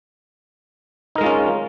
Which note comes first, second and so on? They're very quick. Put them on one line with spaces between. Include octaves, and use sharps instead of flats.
D#4 A#4 G#3 F4 C#4